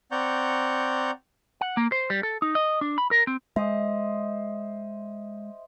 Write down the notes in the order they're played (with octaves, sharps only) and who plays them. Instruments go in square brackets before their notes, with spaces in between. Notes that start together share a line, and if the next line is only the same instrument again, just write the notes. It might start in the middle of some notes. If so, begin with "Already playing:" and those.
[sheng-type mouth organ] C4 D5 F#5 A#5 C#6 G6
[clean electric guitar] F#5
A#3
C5
G3
A4
D#4
D#5
D4
B5
A#4
C4
[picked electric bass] G#3 [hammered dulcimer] C5 D#5 [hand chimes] E5